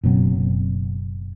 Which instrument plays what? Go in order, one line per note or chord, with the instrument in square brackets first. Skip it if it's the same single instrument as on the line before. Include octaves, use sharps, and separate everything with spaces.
[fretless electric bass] F#1 B2 F#3 C4